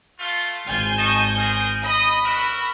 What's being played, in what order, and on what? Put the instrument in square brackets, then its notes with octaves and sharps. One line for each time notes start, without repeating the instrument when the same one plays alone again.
[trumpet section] A3 F4
[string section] G#1 G#5 G6 [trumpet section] F4
[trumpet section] D#5 A5 C#6
G#4 A#4 C5
[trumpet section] D#5 [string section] B5
[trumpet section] F#4 A#4 E5